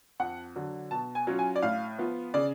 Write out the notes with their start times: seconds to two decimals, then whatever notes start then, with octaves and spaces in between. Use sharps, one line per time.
0.20 F2 F#5
0.56 D3 F#3
0.91 B2 A5
1.15 G#5
1.27 F#3 C#4 F4
1.39 G#5
1.56 D5
1.62 A2 F5
1.98 F3 B3 F4
2.34 C#3 D5